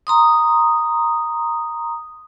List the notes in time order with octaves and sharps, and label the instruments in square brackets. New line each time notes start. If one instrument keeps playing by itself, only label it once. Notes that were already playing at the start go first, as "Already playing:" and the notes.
[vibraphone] A#5 C6 D#6